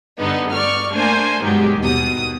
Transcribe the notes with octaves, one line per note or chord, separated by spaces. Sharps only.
G2 D3 B3 D#4
D5 C#6 F6
A3 A#3 D4 C5 G#5
G2 B2 D#3 F#3 G#3 G4
D#2 B2 D#6